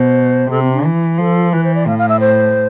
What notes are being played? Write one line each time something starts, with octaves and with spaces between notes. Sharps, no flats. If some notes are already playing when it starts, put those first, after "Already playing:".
Already playing: B2 C5
C3 A4
C4
D4
E3
F3 A4
E3 B4
C5
D5
A2 F5
F5
E5
C5